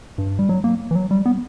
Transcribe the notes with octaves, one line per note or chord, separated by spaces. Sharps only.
G2
G3
F#3
A#3
E3
F#3
G3
B3